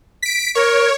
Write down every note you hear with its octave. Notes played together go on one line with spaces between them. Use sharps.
B6 D7
A#4 C#5